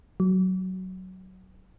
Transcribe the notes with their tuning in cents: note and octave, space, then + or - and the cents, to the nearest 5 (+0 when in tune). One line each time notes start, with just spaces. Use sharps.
F#3 +10